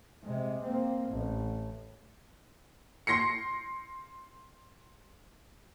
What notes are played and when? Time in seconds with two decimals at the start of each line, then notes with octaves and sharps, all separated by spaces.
0.24 C3 G#3
0.63 A#3 C4
1.09 A1
3.07 C6 A#6 C7 C#7